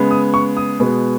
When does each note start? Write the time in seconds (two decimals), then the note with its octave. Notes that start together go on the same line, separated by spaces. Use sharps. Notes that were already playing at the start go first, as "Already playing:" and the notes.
Already playing: C#3 G#3 B3
0.11 D#6
0.34 C#6
0.57 D#6
0.80 B2 G#3 B3